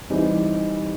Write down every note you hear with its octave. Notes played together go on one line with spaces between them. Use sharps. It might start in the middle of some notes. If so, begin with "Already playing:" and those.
E3 G3 C4 D#4 G4